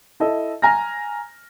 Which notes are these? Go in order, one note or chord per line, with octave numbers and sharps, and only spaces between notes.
E4 A4 D#5
G#5 A#5 F6 A#6